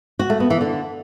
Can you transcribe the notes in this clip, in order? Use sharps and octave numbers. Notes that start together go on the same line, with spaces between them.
F#4
A3
B3
E3
D3